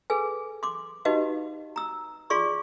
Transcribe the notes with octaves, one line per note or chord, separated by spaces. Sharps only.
G#4 A4 B4 G#5
C6 D6
D#4 F#4 G4 B4 D#5 F5
A#5 E6
F4 G#4 D5 C6 C#6